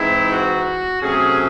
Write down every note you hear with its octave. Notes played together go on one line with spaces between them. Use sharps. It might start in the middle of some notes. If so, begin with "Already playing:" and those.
Already playing: G#2 E3 C4 D#4 E4
F#4
C3 F#3 A3 C#4 G#4